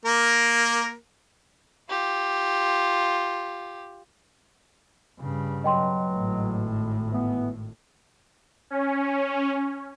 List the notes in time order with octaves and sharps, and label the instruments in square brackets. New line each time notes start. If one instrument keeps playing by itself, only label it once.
[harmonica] A#3 A#4
[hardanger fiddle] F4 G4
[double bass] G2 C#3
[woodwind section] B2 F#3 [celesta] D#5 G5 C6
[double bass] G#1 A2
[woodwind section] E3 B3
[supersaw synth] C#4